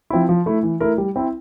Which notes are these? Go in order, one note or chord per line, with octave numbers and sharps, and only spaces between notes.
F3 C4 E4
F3
A3 E4
E3
A3 E4 A#4
G3
C4 E4